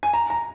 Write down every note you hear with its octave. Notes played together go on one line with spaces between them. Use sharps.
G#5
A#5
A#5